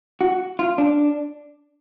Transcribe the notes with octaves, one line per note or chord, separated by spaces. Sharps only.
F#4
F4
D4